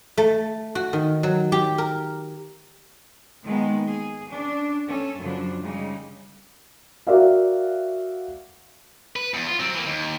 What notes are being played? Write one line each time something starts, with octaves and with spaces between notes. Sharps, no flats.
A3
F#4
D#3
F#3
G4
A#4
D#3 G#3 A#3 B3
G#4
C#4 D4
C#4 A4
F#2 C#3 F3 D4
C#3 G3 G#3 D#4
F#4 A#4 D5 E5 F5
B4
E2
F4
F#3 C4
E3 A#3
D#2